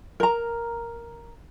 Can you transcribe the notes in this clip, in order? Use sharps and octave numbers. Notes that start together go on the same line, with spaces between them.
A#4 A#5